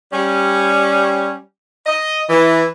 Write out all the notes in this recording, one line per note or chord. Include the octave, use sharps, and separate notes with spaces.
G3 C#4
D#5
E3